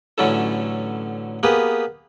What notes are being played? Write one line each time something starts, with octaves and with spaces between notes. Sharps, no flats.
A1 D3 F#3 C#4 E4 A4
A#3 B3 G4 G#4 B4